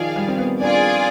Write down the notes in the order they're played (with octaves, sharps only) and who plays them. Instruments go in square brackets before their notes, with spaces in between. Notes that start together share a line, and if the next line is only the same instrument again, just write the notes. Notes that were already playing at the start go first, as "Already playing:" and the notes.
Already playing: [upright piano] D#3 F3 [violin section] G#4 D5 F5
[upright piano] G3
C4
B3
[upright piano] D4 [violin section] F4 G#4 D5 G#5